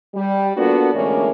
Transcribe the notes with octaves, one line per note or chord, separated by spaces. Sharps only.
G3
A#3 B3 D4 F4 F#4 A4
D2 A2 E3 G#3 A#3 C#4